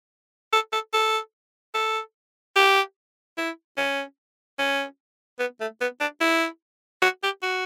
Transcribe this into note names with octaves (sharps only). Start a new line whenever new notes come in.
A4
A4
A4
A4
G4
E4
C#4
C#4
B3
A3
B3
D4
E4
F#4
G4
F#4